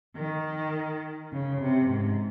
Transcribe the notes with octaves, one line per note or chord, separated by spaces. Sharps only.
D#3
C#3
C3
G#2